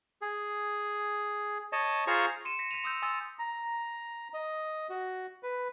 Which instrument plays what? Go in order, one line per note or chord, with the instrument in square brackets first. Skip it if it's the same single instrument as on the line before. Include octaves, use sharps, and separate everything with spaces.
[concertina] G#4
C#5 D#5 A5
F4 G#4 C5 A#5 C#6
[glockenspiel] C6 C#7 D#7 E7
A#6 B6 C#7
A#6 B6 C#7 D#7 F7
C6 D#6 E6 G6 B6
G#5 C6 D#6 E6 A6
[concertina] A#5
D#5
F#4
B4